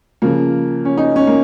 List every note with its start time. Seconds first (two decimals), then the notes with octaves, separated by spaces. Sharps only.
0.22 C#3 F3 A#3
0.85 C#4
0.97 D#4
1.16 C#4
1.27 A#3